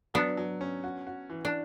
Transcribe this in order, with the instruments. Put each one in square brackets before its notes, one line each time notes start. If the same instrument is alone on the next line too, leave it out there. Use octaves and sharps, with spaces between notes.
[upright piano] F#3 [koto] B3 D4
[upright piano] F#3
C#4
F#4
F#4
E3
[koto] D4